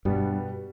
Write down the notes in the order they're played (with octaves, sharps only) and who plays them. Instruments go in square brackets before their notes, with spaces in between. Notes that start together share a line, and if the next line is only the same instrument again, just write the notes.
[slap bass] G2 [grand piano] B2 G3 B3